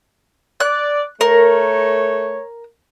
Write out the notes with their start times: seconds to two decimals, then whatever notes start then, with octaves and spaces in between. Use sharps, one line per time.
0.60 D5 F#6
1.21 A3 A#4 C#5